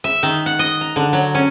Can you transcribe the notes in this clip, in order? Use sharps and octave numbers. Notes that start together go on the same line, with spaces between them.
E5
D#3
F#5
D#5
A#5
D3
F#3
C#4